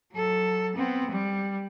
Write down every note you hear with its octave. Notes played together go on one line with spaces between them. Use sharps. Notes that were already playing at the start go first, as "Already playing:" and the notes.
F#3 A4
B3 C4
G3